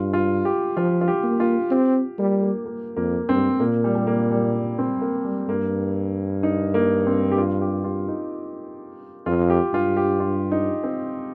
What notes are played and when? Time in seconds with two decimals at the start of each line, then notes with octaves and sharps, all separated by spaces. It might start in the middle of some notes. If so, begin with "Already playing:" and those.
Already playing: G2 F4
0.13 F4
0.45 G4
0.77 F3 F4
1.01 F4
1.08 G4
1.23 A#3
1.40 F4
1.71 C4 G4
2.18 G3 A#3
2.42 A#3
2.65 A#3
2.96 F2 A#3
3.29 G2 C4
3.60 A#2 A#3
3.84 G3
3.95 G3
4.07 A#3
4.31 G3
4.78 C4
5.01 A#3
5.25 G3
5.49 G2 A#3
6.43 D#4
6.74 A#3
7.06 C4
7.32 G4
7.38 F4
7.61 G4
7.84 F4
8.08 D#4
9.26 F2 F4
9.50 G4
9.73 G2 F4
9.97 G4
10.20 F4
10.51 D#4
10.83 C4